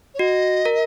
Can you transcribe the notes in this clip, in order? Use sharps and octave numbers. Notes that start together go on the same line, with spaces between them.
C#5
F#4 D#5
A#4